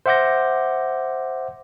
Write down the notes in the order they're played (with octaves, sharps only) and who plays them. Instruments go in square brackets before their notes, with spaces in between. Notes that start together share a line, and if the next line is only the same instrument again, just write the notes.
[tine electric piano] C5 E5 F#5 D6 G6 A#6